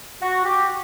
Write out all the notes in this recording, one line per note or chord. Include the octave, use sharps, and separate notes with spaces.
F#4
G4